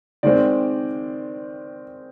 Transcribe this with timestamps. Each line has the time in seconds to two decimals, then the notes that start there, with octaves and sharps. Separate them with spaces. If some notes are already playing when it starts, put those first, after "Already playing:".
0.23 D#3 G#3 C4 D5